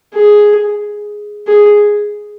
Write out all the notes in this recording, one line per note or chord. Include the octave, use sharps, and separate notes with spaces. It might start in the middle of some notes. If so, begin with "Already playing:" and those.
G#4
G#4